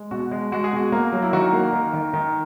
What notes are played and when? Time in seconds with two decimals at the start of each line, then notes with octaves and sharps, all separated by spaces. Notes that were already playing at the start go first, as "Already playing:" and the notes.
Already playing: G#3
0.11 B2 F#4
0.32 G#3
0.52 G#3 F#4
0.64 G#4
0.73 B2 F#4
0.92 A#3
1.13 F#3
1.22 E4
1.33 D#3 F#4
1.53 A#3
1.73 D#3
1.94 D#3
2.13 D#3